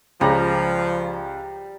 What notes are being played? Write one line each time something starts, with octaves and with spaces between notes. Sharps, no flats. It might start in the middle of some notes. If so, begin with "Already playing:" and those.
C#2 F3 G3 A#5